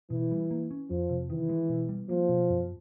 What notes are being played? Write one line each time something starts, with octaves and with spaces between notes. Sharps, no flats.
B2 E3
G3
A#3
C#4
F2 F3
C3
D#3 E3
G#3
B2
G3
F3 A#3
B2
F#2